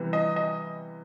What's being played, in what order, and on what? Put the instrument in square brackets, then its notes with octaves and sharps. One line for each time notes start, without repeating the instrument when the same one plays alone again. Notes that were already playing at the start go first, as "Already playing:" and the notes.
Already playing: [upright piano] C3 E3 G3 B3
D#5
D#5